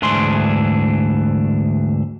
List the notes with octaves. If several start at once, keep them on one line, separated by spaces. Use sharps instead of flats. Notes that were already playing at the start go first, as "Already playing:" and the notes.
D2 G#2 E3 D4 G#4 C6